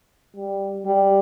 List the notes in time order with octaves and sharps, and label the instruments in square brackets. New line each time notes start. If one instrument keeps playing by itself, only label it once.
[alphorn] G3
G3